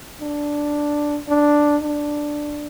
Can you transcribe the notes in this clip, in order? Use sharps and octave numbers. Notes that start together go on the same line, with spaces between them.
D4
D4
D4